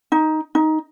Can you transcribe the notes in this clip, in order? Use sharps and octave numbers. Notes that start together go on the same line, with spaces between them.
D#4
D#4